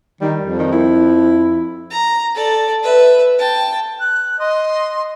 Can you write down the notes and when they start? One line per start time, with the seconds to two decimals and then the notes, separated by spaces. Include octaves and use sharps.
0.21 D#3 G3
0.40 F2
0.59 D#3
0.72 E4
1.91 A#5
2.35 A4 D5
2.83 B4 E5
3.38 G5 A5
4.00 F#6
4.40 D#5 C6